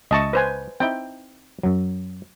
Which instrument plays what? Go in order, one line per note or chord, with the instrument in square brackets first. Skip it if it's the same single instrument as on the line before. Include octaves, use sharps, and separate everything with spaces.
[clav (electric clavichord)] C#2 E5 [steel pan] D#5 A5 C#6
[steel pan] B4 C5 G#5
[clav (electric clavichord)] C4 D#4 E4 [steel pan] G5
[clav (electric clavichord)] F#2 F#3